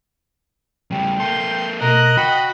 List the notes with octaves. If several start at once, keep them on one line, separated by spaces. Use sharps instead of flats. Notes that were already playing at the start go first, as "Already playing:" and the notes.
C#3 G3 G5
A#3 A4 C6 G6
B2 A#4 D#5 F#6
F#4 G5 B5